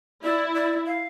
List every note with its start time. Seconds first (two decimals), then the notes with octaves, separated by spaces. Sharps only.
0.23 E4 D5
0.55 D5
0.86 F5